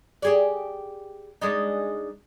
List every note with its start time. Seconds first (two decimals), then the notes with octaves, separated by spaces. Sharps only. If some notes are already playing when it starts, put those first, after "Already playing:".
0.22 G4 G#4 D5
1.42 G#3 D4 D#4